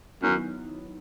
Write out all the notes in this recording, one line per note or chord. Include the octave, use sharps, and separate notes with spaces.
F#2 D#3 F#3 B3 E4